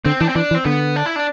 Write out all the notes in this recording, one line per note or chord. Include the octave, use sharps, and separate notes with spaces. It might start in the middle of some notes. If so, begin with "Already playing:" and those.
D3 C4
E3 D4
C4
E3 D4
E3
C4
D3 B3
D4
E4
D4